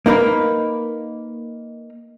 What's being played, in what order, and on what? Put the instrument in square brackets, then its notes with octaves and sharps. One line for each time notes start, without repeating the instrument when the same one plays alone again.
[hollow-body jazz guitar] A#3 D#4 A#4 B4